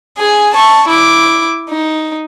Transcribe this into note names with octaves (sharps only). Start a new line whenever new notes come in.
G#4 G#5
A5 C#6
E4 D6
D#4